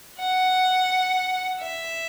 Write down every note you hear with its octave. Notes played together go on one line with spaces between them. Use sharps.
F#5
E5